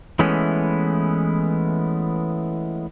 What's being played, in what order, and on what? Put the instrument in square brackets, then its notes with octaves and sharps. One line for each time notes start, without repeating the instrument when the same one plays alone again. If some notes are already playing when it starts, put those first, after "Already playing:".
[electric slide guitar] E3 G#3 A3 B3 C#4 E4